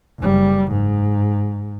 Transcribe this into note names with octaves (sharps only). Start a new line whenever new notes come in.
F#1 G3
G#2